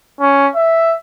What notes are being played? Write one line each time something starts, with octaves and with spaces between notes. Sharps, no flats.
C#4
E5